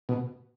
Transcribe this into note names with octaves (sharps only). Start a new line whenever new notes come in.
B2